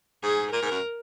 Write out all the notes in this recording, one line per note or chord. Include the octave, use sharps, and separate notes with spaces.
G#2 G#4
A#2 A#4
G#2
F#2